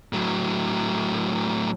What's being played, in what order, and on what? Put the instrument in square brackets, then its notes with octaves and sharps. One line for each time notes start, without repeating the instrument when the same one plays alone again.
[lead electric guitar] A2 F#3